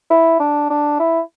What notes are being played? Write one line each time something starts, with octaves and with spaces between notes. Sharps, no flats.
E4
D4
D4
E4